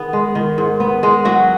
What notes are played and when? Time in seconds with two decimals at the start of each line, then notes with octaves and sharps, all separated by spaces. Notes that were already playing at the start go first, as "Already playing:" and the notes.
Already playing: D#3 B3 G#4
0.13 G#3
0.35 D#3
0.58 G#2
0.80 B3
1.03 G#3
1.25 F#3 F#4